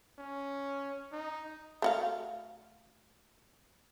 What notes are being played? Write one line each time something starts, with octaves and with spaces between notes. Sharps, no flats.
C#4
D#4
A3 F#4 F5